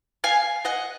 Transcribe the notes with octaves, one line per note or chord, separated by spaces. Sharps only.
F5 G#5
D#5 F#5